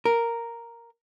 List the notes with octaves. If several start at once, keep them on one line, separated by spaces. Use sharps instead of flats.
A#4